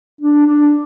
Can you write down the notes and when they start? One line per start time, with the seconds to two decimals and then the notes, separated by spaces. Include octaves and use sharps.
0.21 D4
0.47 D4